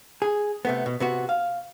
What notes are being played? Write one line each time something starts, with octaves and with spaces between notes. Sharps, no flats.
G#4
C3 A3 B3
B2
C3 B3 F#4
F5